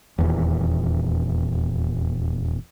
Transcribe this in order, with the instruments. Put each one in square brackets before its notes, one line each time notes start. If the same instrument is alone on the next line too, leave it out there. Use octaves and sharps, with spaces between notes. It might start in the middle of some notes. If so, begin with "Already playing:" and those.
[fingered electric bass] D#1 E2